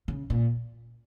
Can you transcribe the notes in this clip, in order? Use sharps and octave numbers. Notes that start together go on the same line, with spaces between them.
C#3
A#2